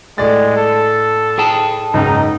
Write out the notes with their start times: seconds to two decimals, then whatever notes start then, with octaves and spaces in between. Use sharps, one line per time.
0.18 A2 G#3 D5 A6
0.57 A4
1.38 G#4 G5 A5
1.94 F#1 C#2 G#2 D#4